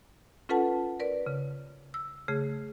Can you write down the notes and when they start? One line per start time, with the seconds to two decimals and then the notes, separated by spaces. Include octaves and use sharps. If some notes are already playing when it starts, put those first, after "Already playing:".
0.49 C#4 F4 A4 B4 F#5 A5
0.99 A#4 B4 D5
1.26 C#3
1.94 E6
2.28 C#3 A3 G#4